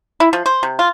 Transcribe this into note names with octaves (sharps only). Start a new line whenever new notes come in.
E4
F3
C5
C3
F4